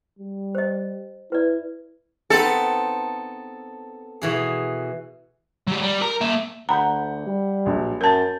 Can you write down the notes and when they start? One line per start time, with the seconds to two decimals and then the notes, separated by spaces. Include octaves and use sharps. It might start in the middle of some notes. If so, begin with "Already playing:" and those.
0.19 G3
0.55 C5 D#5
1.32 E4 B4 D5
2.30 B3 C4 D#4 A4
4.22 B2 E3 G#4
5.67 F#3 G4
5.82 G3
6.02 A#4 A#5
6.21 A#3 E5
6.69 D2 F#5 A#5 B5 G6
7.26 G3
7.65 A#1 F#3
8.01 F#2 A#4 A5 G6 A6